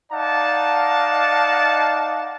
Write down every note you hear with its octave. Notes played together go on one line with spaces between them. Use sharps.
D#4 D5 F5 F#5 A5